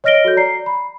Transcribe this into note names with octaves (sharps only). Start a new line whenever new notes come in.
C#5 D#5 F6 A#6 D7 G7
F#4 A4 C#5 G6
D5 A#5 C7
B5